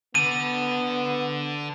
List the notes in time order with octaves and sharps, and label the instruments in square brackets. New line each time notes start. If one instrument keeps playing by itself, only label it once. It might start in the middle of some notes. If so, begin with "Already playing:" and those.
[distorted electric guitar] D3 [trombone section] B3 [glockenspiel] D#7